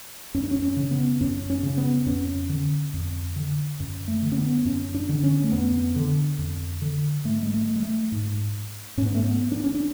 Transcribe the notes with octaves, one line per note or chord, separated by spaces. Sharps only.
F#2 C#4
D4
C#4
C#4
C#3
B3
F#2 C#4
C#4
C#3
B3
F2 C#4
D3
F2
D3
F#2
A3
D3
C#4
B3
F#2 C#4
D4
D3
C#4
A3
F2 B3
D3
F2
D3
G#2 A3
G#3
A3
G#3
A3
G#2
G#2 C#4
B3
A3
B3
D4
C#4
D4